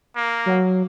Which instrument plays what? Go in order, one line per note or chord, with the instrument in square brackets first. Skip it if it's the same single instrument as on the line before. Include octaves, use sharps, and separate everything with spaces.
[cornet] A#3
[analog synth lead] F#3